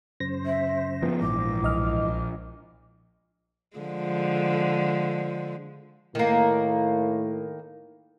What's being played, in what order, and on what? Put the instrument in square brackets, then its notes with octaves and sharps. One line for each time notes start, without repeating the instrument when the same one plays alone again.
[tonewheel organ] F#2 C#3 C5 [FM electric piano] A#6
[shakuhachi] E5
[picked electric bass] F3 B3
[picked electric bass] A#1 [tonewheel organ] G#2 E3 [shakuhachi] D6
[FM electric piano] B1 D#5 F6
[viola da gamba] D3 F3 G#3
[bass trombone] A2 [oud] D#3 A#3